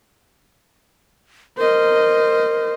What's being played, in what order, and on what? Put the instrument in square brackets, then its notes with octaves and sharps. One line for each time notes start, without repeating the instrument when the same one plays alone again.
[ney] A#4 [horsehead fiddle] C5 D#5